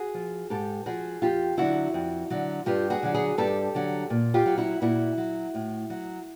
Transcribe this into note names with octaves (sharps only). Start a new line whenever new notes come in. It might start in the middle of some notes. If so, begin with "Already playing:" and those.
Already playing: F#4 G#4
F3
G#2 G4 A4
F3 F#4 G#4
F2 F4 G4
D3 F#3 E4 F#4
F2
D3 F#3
G2 F4 G4
F#4 G#4
D3 F#3
F#4 G#4
G2 G4 A4
D3 F#3
A#2
F4 G4
F#3
E4 F#4
A#2 E4 F#4
F#3
A2
F#3